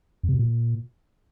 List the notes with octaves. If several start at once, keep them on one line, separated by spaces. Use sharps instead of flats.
F2
C3
B2
A#2